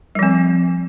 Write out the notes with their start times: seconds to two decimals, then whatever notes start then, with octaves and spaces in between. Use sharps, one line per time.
0.15 G3
0.19 F3
0.23 C4